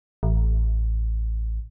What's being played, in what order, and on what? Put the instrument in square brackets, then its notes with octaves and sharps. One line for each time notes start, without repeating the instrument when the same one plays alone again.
[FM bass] A1